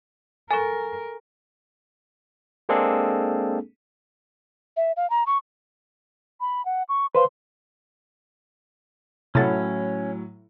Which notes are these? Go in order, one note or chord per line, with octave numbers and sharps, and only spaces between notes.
A4 A#4 G#5 C#6
G#3 A#3 C4 D4 G#4 A4
E5
F5
A#5
C#6
B5
F#5
C#6
B4 C5 F5 C6
A2 C3 F#3 C#4 E4 A4 F#5 A6